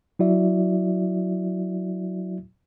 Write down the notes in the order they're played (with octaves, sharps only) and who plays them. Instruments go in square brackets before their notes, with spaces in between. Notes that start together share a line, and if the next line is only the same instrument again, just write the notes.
[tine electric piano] F#3 E4 F#4 D5 E5